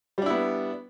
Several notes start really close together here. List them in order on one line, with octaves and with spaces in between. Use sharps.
G3 D4 E4 B3